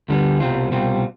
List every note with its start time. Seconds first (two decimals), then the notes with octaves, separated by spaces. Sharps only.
0.08 D2 D3 G3 B3
0.40 C2 B2 G3 C4 F4
0.71 C2 B2 G3 C4 F4